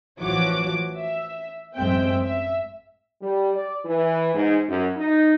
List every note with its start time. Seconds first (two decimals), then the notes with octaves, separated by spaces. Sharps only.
0.20 A1 E3 F3 F#4 C#5 D6
0.97 E5
1.76 A1 F#2 G#3 C4 E5 G5
2.22 E5
3.22 G3
3.54 D5
3.85 E3
4.34 G#2
4.68 F#2
4.97 D#4